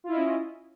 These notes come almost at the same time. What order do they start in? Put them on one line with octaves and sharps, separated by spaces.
F4 E4 D#5 C#4